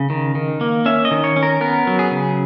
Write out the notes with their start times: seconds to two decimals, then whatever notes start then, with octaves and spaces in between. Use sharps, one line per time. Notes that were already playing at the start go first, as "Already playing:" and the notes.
Already playing: C#3
0.10 D#3
0.35 D#3
0.61 A#3
0.86 C#4 E5
1.05 D#5
1.11 D#3
1.24 C#5
1.36 C#4
1.43 A#4
1.61 B3 A#4
1.87 F#3
1.99 G#4
2.11 C#3